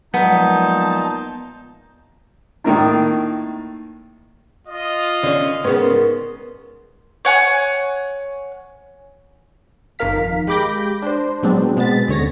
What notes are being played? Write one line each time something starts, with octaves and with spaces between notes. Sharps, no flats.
A#2 F3 F#3 G#3 B3 D#4 A5 G6
A2 D#3 A#3 D4
F4 D#5
D3 C#4 D5
G#2 C#3 B3 A#4 B4
C#5 F#5 G#5
G1 F2 D#3 A#4 F5 B6
G#3 G4 B5 D6 G6 A#6
D4 C5
A#2 F#3 G#3 B3 C4 D4
B2 G#3 B3 C4 A6 B6
D#2 D3 C#5 A#6